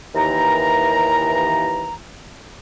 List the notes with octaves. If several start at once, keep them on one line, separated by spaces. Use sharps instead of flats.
D#2 E3 A#5